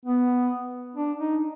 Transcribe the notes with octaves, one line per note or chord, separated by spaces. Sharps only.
B3
D4
D#4